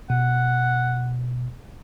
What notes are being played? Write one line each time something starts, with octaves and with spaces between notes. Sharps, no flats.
B2 F#5